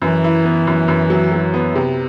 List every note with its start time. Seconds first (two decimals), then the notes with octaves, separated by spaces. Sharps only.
0.02 F#2 E3
0.24 E4
0.45 B3
0.67 F#2
0.88 F#2
1.10 F#3
1.32 F#3
1.54 B3
1.75 C3